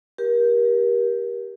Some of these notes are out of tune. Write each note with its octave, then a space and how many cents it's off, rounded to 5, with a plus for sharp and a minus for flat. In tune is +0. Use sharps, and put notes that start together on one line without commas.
G4 +0 A#4 +30